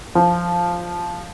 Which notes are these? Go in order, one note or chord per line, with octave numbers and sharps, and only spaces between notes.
F3